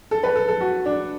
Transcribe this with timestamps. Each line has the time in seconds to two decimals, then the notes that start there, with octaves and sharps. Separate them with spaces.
0.11 A4
0.23 B4
0.36 A4
0.48 A4
0.61 F#4
0.86 D4